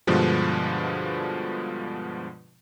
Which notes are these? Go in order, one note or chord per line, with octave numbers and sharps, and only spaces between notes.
G2 B2 D3 F3 G#3